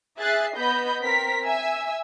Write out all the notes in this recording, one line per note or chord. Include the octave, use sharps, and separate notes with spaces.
G#4 E5 F#6 A6 C7
B3 D#5 B5 G6
C4 A#4 B6
E5 G#5 E6